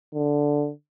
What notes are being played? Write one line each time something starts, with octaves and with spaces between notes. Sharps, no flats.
D3